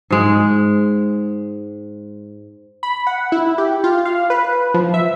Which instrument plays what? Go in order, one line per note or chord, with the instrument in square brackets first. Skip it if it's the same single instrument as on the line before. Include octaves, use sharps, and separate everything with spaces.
[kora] G#2 G#3
[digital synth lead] B5
F#5
E4
G4
F4
F5
B4
F3
E5